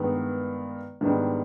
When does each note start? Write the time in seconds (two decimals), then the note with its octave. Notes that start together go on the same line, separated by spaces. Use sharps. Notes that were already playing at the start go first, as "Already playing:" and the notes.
Already playing: G2 D#3 G#3 B3
1.01 G#2 D#3 G3 B3 D4